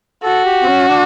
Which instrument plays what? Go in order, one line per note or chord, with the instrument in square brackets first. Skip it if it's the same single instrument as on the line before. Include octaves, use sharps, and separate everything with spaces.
[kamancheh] F#4 [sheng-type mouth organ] A4
[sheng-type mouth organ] G4
C4
C#4
D4